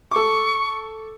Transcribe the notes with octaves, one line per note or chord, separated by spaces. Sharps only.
A4 C#6 D6